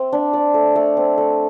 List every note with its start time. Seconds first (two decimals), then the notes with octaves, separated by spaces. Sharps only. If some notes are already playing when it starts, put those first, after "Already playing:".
Already playing: C4 E5
0.13 D4
0.33 D5
0.54 A3
0.76 A3
0.97 C4
1.18 A3